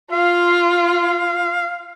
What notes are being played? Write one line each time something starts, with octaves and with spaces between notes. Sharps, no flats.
F4 F5